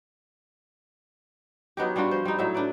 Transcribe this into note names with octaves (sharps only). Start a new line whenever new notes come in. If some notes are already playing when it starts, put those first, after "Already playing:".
F#3 B3 D#4 G4
G3 D4 F4 F#4
F3 C5
G3 D#4
A2 F#3 D#4 E5
D4 B4 D5